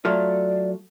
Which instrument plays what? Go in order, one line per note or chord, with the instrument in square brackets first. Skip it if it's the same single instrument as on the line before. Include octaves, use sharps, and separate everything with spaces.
[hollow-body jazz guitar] F#3 A3 F4 [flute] D5